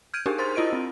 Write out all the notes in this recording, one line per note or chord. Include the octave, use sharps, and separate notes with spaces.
F6 G6 G#6 D7 D#7
D4 D#4 G4 G#4 A#4
A#4 C5 C6 A6
E4 F4 D#5 D7 D#7
C4